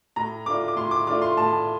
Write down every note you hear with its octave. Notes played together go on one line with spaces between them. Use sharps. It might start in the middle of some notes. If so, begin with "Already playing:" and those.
A2 A#5
A3 D4 F4 D6
D6
A2 C6
D6
A3 D4 F4 D6
C6
A2 A5